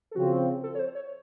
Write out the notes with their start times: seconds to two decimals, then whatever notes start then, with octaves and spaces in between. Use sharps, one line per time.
0.11 A4
0.16 C#3 F3 C4 F#4
0.63 A4
0.75 C#5
0.79 C5
0.95 C#5